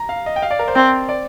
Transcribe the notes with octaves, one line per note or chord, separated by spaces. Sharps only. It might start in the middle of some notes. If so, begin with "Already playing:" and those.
Already playing: A#5
F5
D#5
G5
F5
D5
A#4
C5
C4
D5